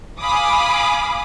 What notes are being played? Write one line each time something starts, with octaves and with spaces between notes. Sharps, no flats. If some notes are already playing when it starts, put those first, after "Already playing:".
F5 G#5 B5 D6 D#6